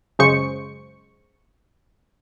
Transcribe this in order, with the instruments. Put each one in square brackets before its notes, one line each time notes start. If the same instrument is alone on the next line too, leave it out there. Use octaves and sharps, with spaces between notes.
[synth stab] F#2 C#3 G#3 C5 C#6 C#7